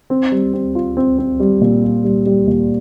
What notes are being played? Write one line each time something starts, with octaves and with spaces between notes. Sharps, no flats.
C4
G3
C4
F4
C4
C4
G3
A#2
G3
G3
G3
A#2